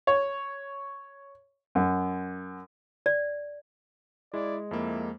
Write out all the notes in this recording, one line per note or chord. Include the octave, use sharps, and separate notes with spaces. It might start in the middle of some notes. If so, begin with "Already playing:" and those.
C#5
F#2
D5
G#3 E4 D5
F2 A#3 E4